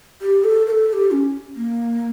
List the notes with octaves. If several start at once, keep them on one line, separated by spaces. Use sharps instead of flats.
G4
A4
A#4
A4
A4
G4
C#4
A#3